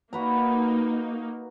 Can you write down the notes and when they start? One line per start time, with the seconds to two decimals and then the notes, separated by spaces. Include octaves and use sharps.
0.13 A#3 D#4 F#4 B4 A#5